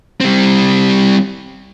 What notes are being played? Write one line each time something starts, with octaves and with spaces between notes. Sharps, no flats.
G3 C4